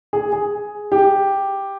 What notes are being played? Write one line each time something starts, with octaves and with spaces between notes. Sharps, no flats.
G#4
G#4
G4